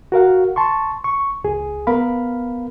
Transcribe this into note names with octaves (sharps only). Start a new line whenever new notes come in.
F#4 A#4 F5 F#5
A5 C6 C#6
C#6
C#2 G#4
B3 A#4 F5 B5